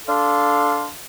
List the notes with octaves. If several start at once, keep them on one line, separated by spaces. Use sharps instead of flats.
D4 A4 F5 C6